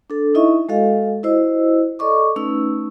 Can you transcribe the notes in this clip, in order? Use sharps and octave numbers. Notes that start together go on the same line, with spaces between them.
D4 A4
D#4 E4 D#5 E5 C#6
G#3 F#4 A4 D#5 F5 G#5
E4 F#4 C5 D#5 E6
A4 D5 D#5 C#6 D6
A3 C#4 D#4 B4 E6